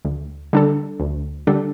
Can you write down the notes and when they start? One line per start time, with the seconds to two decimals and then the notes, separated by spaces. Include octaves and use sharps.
0.05 D2
0.53 D3 G3 D4 A4
1.00 D2
1.47 D3 G3 D4 A4